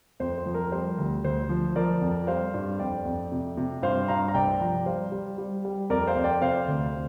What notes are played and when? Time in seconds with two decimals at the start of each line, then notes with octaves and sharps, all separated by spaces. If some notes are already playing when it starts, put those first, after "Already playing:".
0.20 F2 C5
0.38 C5
0.46 F3
0.54 A#4
0.72 G3 C5
0.98 D2
1.24 D2 C5
1.49 F3
1.76 F3 A#4 D5
2.01 F2
2.27 G3 C5 F5
2.54 G2
2.79 F2 D5 G5
3.05 F2
3.32 C3
3.57 C3
3.82 G2 C5 F5
4.08 G2 F5 A#5
4.28 A#5
4.34 C2 D5 G5
4.60 F3
4.86 G3 C5 F5
5.12 G3
5.38 G3
5.65 G3
5.90 F2 A#4 D5
6.07 C5 F5
6.15 F2
6.24 D5 G5
6.41 C3 C5 F5
6.68 D2